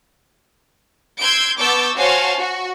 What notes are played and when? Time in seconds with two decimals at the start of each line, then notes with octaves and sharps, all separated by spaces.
1.20 C6 E6 G6 G#6 D7
1.58 B3 A5 C#6 D6 E6 G6
1.96 F#4 C5 C#5 F5 G#5 A5
2.38 F#4